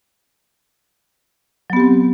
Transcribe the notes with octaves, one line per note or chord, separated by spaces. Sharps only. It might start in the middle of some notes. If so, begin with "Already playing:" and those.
F#3 B3 C4 G4